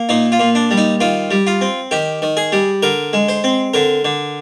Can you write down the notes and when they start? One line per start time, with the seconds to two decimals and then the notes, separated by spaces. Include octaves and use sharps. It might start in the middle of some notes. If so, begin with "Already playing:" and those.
Already playing: A#3
0.09 A#2 D#4
0.32 F4
0.40 A#2
0.55 D4
0.71 G3
0.77 D#4
1.00 D#3 F4
1.31 G3
1.47 F4
1.61 C4
1.91 D#3 G4
2.22 D#3
2.37 G#4
2.52 G3
2.83 D3 A#4
3.13 G#3
3.29 C5
3.44 C4
3.74 D3 A#4
4.05 D3